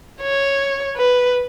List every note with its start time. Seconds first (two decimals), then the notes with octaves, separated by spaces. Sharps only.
0.21 C#5
0.97 B4